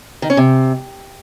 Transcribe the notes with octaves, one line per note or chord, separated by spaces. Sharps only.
D#3
C#4
C3